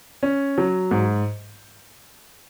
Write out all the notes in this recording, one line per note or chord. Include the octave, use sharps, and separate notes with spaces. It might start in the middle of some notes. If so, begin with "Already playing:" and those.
C#4
F#3
G#2